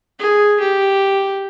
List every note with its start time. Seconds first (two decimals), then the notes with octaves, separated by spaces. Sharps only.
0.19 G#4
0.60 G4